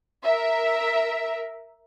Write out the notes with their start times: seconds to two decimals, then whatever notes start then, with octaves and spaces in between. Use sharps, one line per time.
0.24 A#4 E5